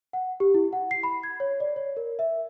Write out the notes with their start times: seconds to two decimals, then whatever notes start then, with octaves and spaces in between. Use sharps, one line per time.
0.13 F#5
0.40 G4
0.55 E4
0.73 F#5
0.91 C7
1.03 B5
1.23 G#6
1.40 C#5
1.60 D5
1.76 C#5
1.97 A#4
2.19 E5